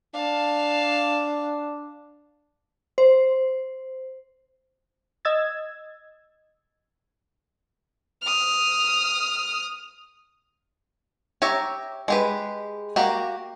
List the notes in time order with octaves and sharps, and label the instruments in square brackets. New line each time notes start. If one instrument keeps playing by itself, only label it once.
[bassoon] D4 [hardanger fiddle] F5 A5
[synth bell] C5
[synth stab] D#5 E6 G#6 A6
[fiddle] D#6 F6
[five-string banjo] G4 C#5 E5 A#5
G#3 G4 B4
A#3 F#4 G4